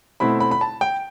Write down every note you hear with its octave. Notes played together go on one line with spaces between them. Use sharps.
B2 A3 C4 E4 B5
B5
B5
A5
G5